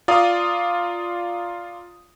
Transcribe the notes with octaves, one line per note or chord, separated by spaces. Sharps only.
F4 D5 F5 A#5 D#6